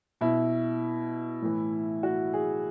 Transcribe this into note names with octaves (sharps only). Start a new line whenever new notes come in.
B2 E4
A2 E3
F#4
G#4